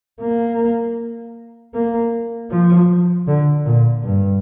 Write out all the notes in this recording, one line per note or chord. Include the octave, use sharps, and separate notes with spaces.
A#3
A#3
F3
D3
A#2
G2